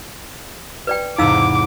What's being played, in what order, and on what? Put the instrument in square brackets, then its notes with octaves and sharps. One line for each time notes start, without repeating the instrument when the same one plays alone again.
[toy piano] B4 D5 G5
[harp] E2 G#2 C3 [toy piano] D#4 F5 E6 [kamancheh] D6